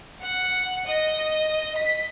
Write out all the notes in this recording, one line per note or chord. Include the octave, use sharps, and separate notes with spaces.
F#5
D#5
B6